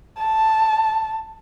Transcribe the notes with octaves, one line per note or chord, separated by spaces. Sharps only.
A5